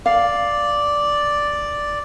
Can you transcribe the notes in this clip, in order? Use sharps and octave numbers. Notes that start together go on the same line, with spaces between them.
D5 F5